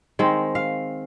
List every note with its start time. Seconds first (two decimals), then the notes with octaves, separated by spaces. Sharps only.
0.19 D#3 G#3 C4
0.55 F5